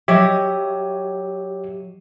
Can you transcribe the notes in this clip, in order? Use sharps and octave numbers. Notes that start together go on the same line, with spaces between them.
F#3 G4 C#5 D#5 E5